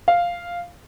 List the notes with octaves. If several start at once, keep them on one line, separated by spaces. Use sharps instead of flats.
F5